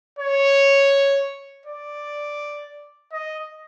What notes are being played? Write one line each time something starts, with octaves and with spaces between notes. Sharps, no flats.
C#5
D5
D#5